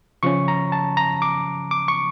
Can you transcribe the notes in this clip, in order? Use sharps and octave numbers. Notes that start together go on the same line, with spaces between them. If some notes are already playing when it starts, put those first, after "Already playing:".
C#3 F3 C#4 C#6
A#5
A5
A#5
D6
D6
C#6